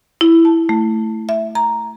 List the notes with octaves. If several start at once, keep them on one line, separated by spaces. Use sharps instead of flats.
E4
A5
A3
E5
A#5